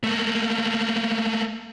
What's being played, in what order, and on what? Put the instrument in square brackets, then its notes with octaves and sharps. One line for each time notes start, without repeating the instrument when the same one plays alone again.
[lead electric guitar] A3 A#3